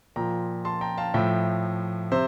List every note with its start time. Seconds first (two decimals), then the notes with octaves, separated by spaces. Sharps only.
0.16 A#2 F3 G5 A#5
0.65 A5 C6
0.81 G5 A#5
0.98 F5 A5
1.14 A2 F3 E5 G5
2.11 C3 C5 E5